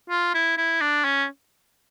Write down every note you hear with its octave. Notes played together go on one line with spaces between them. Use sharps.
F4
E4
E4
D4
C#4